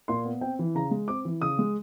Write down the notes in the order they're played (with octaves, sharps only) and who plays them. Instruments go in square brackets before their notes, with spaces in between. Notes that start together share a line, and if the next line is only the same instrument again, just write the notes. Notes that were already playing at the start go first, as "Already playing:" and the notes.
[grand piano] A#2 C6
B3
C4 G5
E3
C#3 A#5
G#3
C4 D6
E3
C#3 D#6
G#3